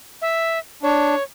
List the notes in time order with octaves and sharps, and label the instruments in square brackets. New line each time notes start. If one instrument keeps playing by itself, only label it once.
[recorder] E5
[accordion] D4 [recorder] C#5